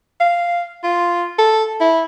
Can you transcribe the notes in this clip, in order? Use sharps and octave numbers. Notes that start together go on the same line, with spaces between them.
F5
F4
A4
E4